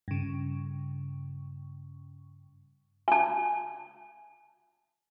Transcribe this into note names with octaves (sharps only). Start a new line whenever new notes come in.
G2 C#3
G#5 A5